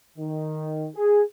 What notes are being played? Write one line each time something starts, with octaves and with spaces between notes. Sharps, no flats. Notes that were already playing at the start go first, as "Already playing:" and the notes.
D#3
G#4